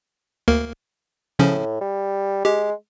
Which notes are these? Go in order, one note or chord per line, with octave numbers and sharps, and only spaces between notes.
D2 A#3 A#4
A2 C#3 F3 C#4
G3
G#3 G4